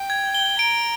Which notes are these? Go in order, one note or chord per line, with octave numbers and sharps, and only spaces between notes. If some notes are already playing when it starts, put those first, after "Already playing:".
Already playing: G5
G#6
G7
A#5 D7